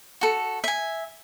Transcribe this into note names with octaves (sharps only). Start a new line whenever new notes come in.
F#4 A4
E5 G#5